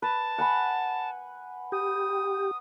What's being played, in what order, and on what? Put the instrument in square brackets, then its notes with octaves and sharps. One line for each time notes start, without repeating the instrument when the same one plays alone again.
[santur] B4 [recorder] A5
[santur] F#5 G#5 B5
[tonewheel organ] G4 [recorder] D#6